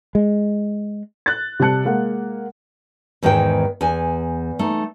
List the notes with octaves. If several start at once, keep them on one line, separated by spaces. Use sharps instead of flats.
G#3
F#6 A6
C3 G3 A5 F#6 C#7
G#3 A#3 F#5
E2 G#2 D#3 B4 G5
E2 G#5
A3 D#4